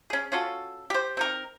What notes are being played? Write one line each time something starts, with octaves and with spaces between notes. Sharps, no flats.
C#4 G#4
C#4 F4 F#4 A4
G4 C5
C4 D#4 A#4